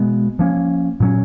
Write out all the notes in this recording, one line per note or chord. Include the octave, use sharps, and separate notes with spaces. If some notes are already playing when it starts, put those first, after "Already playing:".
Already playing: B2 G#3 B3
F3 A#3 C#4
A#2 F#3 C#4